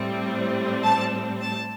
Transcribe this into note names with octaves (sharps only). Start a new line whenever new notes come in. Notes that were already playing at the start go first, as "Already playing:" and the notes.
Already playing: A2 G3 C4
A5
A5